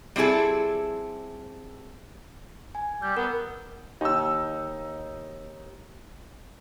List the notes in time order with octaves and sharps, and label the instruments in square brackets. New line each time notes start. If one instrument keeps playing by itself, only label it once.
[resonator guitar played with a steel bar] G3 C4 E4 G#4 A4
[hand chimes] G#5
[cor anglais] G3 [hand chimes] G6
[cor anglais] B3 [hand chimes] A#4
[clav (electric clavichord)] D#2 [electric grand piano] D#4 E6